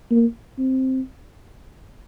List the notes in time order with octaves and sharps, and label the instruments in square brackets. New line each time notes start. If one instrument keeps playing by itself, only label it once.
[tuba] A#3
C4